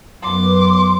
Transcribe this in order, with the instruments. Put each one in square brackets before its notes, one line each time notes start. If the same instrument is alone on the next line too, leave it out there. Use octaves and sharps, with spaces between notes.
[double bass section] F#2 B3 [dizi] C6 [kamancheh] D6